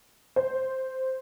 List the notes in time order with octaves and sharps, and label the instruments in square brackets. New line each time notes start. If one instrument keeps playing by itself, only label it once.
[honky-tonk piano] C5